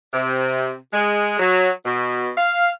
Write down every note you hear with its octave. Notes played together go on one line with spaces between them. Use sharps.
C3
G#3
F#3
B2
F5